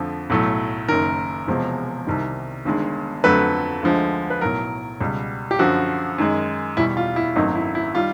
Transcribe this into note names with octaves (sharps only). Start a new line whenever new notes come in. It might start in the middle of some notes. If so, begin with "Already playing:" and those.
Already playing: F2 D3 F3 A3
B1 A2 F#3 A3
F#1 F#2 D#3 A#4
E1 E2 C3 F3 G#3
C2 C3 D#3 G3
G1 G2 D#3 G#3
F2 D3 F#3 A3 B4
D2 D3 F3 G#3
B4
B1 A2 F#3 A#4
C#2 B2 G3
G4
F#2 D3 F3 F#4
F#2 D#3 G#3
E2 B2 G3 E4
F4
E4
G#1 F#2 D#3 F#3 A3 D#4
E4
E4
D#3 G3 F4